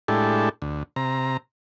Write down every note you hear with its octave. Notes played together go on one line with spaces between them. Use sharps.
A2 G#3 D4 E4 G4 A4
D2
C3 A#5